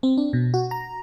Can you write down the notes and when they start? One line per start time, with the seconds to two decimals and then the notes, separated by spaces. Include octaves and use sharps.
0.03 C4
0.17 D4
0.33 B2
0.54 F#4
0.71 A#5